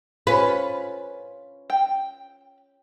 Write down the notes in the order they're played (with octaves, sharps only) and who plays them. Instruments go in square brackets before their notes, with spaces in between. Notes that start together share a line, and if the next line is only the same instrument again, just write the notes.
[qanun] C#4 F4 [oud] B4
[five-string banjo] G5